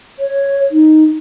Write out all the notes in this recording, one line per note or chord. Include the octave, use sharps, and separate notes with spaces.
C#5
D#4